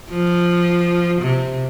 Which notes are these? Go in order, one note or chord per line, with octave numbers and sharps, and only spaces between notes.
F3
C3